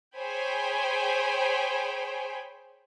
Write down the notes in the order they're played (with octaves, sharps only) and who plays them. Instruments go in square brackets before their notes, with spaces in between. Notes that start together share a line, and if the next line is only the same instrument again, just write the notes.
[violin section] G#4 C5 C#5 G5 G#5 B5